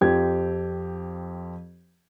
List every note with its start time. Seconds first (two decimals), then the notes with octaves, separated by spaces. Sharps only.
0.01 F2 C4 G4 G#6